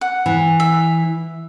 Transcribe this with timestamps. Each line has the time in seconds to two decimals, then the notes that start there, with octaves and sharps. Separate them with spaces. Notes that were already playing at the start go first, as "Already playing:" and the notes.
0.01 F#5
0.26 E3
0.60 E5